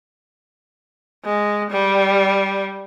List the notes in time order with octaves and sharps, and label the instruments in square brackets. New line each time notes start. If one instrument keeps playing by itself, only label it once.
[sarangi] G#3
G3